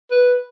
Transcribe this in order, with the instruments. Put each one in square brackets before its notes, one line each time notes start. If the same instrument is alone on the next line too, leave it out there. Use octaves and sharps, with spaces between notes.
[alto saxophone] B4